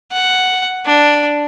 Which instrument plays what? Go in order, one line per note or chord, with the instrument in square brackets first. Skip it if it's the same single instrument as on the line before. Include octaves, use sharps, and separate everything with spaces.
[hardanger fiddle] F#5
D4